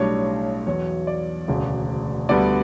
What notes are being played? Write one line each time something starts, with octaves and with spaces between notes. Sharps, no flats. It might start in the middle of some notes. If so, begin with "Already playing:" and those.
Already playing: B1 A2 G3 D4 C#5
E2 B2 F#3 C#5
D5
E1 D2 C#3
D2 D3 G3 B3 D5